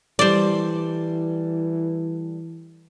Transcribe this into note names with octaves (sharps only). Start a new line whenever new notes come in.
E3 G3 A4 C5 D5